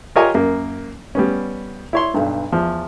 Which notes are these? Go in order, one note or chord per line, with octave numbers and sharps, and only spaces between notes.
F4 G4 A#4 C#5 D#5 G#5
F#2 A#3
G3 B3 C#4
E4 C#5 C6
B1 G2
E2 F3